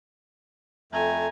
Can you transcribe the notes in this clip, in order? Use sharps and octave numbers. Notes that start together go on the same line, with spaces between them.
F2 A3 G#5 A#5